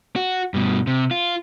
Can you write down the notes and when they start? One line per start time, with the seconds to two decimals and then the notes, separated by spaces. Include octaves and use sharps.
0.16 F#4
0.54 G2 B2
0.87 C3
1.11 F4